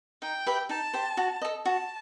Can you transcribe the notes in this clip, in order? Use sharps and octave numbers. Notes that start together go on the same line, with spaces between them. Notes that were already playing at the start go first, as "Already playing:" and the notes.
D#4 G5
G4 B4 E5
D#4 A5
G4 C5
F#4
A4 D#5
F#4 A5